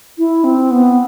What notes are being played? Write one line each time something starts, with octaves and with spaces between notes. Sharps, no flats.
E4
C4
B3